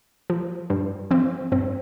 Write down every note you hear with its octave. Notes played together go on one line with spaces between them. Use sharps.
F3
G2
F3 C4
G2 C4